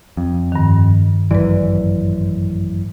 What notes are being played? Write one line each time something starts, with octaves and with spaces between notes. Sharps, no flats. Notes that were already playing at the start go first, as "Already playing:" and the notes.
F2
G2 D#3
A1 F#2 E3 B4 D5